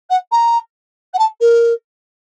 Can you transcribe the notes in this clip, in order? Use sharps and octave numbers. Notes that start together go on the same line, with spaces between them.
F#5
A#5
F#5
A5
A#4